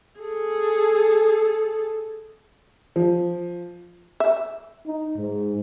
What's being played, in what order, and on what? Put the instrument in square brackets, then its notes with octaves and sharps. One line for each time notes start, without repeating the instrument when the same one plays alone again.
[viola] G#4 A4
[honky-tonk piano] F3
[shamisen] E5
[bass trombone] D#4
G#2